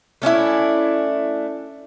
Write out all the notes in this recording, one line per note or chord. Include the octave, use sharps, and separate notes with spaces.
A3 C#4 D4 E4